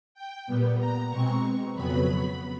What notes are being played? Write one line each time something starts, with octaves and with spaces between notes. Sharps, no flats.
G5
A#2 G3 B3
A#5
B2 G#3 C4 C#6
F2 C#3 F#3 B3 B5